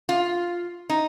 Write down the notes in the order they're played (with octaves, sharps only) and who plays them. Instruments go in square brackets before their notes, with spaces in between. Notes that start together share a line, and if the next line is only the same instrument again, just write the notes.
[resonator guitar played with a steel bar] F4
D#4